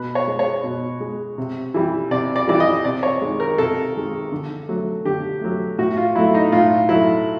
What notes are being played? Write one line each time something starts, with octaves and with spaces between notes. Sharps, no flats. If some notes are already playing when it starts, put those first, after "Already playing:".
Already playing: B2 B4
C#5
G#3
C#5
B2
G#3
C3
E3 G3
C3 D5
D5
E3 G3 D5
D#5
C3 D5
C#5
D#3 G#3
A#4
C3 A4
D#3 G#3
D3
F#3 A3
D3 G4
F#3 A3
A2 F#4
F4
F#3 A3 E4
D#4
A2 F4
F#3 A3 E4